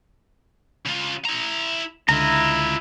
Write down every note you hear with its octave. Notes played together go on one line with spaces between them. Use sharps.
C#3 F4
E4 A#5
C#2 D3 E4 F4 D#5 A#5